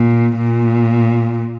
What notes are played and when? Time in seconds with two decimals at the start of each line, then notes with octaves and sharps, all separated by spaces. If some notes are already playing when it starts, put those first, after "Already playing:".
Already playing: A#2
0.37 A#2